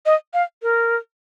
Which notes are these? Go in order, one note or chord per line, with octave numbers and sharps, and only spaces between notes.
D#5
F5
A#4